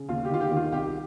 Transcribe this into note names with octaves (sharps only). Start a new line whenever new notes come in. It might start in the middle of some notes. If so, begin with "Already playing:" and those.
Already playing: C#3
D#2 F4
G4
D#3 F4
G4
D#3
F4
C2 G4